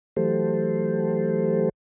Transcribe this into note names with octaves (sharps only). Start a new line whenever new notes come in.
E3 F#3 A3 G4 A4 C5